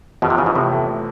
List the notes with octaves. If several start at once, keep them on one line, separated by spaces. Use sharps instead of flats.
F2 B2
C3
C#3 E3
G#2
A2 C3
A3